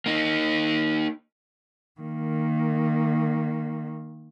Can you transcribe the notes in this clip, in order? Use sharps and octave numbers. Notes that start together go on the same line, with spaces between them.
A#3 D#4
D#3 A#3